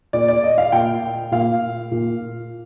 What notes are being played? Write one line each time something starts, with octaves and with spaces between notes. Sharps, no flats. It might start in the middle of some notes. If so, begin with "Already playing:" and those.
A#2 D5
D5
D#5
F5
A#2 G5
A#2 F5
A#2